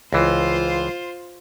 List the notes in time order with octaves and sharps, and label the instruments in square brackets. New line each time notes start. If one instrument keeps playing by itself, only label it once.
[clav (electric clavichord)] C#2 E3 [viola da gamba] F4 C5